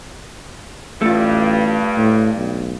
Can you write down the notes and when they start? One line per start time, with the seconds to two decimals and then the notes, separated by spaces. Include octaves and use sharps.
1.02 A1 G2 A3 F4
1.98 A2
2.37 B1